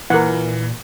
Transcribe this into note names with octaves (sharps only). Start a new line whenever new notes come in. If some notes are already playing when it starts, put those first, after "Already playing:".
A#2 E3 A#4 F#5